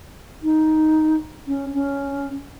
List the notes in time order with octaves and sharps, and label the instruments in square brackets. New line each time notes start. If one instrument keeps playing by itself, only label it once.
[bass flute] D#4
C#4
C#4